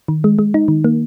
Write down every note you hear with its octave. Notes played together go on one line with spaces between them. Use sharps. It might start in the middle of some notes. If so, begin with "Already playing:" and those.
D#3
G#3
G#3
D#4
D#3
A#3